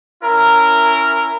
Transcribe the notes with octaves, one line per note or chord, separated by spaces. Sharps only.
C#4 E4 A#4